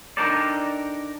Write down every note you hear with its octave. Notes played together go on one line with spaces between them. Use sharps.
D4 D#4 G4 A4 A#4 D5